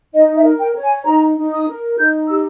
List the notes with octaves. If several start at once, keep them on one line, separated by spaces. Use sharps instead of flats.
D#4 D#5
E5
A#4
G5
C#5
G#5
D#4 A#5
D#4
D#6
A#4
D#4 G6
G4 E6